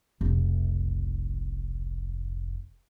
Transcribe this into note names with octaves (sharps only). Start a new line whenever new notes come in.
F1 B1